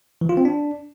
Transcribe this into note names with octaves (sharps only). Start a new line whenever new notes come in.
E3
F4
C4
D4